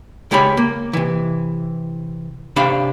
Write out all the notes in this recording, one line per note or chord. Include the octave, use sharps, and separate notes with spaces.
C#2 G#3 G4 C#5 B5
A#3
C3 E3
C3 D4 C5 F5 B5